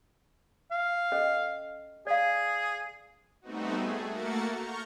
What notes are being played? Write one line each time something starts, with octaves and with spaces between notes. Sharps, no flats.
F5
C#4 A4 D#5
G#4 D5 F5
G3 A3 B3 C4 D#4 F#4
A3 G#4
A3 A#3 F#4 A#4 A6 C#7
A#5 C#6 F6 G6